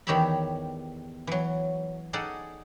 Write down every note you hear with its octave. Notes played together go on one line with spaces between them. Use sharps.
E2 D#3 G4 C#5 E5 B5
E3 F#3
D#4 G#4 A4 D5 F#5